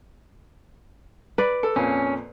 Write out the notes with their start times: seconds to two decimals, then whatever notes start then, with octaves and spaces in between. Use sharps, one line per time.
1.38 B4 D5
1.63 A4
1.76 F2 A#2 C#4